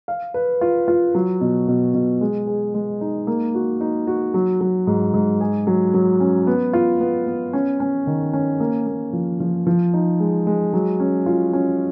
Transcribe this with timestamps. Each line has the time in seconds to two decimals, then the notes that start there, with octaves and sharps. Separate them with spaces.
0.08 F5
0.34 B4
0.61 F4
0.88 F4
1.15 F#3
1.41 B2
1.68 B2
1.94 B2
2.21 G#3
2.47 G#4
2.74 G#3
3.01 D#4
3.27 A#3
3.55 F#4
3.81 D#4
4.07 F#4
4.34 F#3
4.61 F#3
4.87 G#2
5.14 G#2
5.41 G#4
5.67 F#3
5.94 F#3
6.20 C#4
6.47 B3
6.73 F4
7.00 B3
7.27 B3
7.53 C#4
7.80 C#4
8.07 D#3
8.33 C#4
8.60 A#3
8.87 A#3
9.13 F3
9.40 F3
9.67 F3
9.94 D#4
10.20 G#3
10.47 G#3
10.73 F#3
11.00 C#4
11.26 F4
11.53 C#4